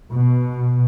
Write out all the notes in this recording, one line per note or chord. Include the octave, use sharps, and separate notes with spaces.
B2